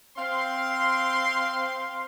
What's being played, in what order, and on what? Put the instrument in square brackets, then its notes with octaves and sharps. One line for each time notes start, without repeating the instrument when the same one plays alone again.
[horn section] C4 F5 C6